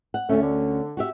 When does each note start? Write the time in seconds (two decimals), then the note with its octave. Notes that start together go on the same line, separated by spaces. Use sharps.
0.14 F#5
0.29 D2 A3 C#4
0.42 D3
0.97 F#4 G4 E5